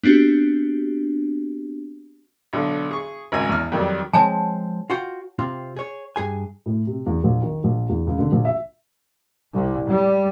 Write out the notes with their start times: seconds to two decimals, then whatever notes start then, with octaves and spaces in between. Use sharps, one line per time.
0.03 B3 C4 D4 F#4 G4
2.53 B1 D3
2.91 G#4 C#6
3.32 G#1 C#2 G#5
3.49 E2 F6
3.72 F2 D#3 F#3 G3
4.13 F3 G#3 C4 C#5 G#5 A5
4.90 F4 F#4 G5
5.39 C3 C4 F4
5.76 G#4 C#5
6.16 G2 G#4 G#5
6.66 A2
6.87 C3
7.06 E2
7.24 A#1
7.41 D#3
7.64 A#1
7.89 E2
8.07 C#2
8.19 D3
8.32 A#1
8.45 E5
9.52 C2
9.87 G3